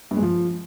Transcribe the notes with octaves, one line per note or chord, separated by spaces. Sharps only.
G2
G#3
F3